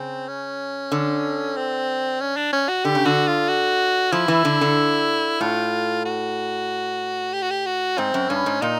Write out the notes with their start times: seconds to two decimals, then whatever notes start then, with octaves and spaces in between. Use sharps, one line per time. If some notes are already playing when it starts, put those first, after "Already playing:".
Already playing: C#3 C4
0.28 C#4
0.92 D3
1.56 C4
2.21 C#4
2.37 D4
2.53 C#4
2.69 F#4
2.84 D3 G4
2.95 C#3
3.05 D3 F#4
3.28 F4
3.49 F#4
4.12 F3 E4
4.28 E3
4.45 D3
4.61 D3
5.41 A2 F4
6.05 F#4
7.33 G4
7.42 F#4
7.51 G4
7.66 F#4
7.98 G#2 C4
8.14 F#2
8.29 G2 C#4
8.46 G#2
8.62 A#2 D#4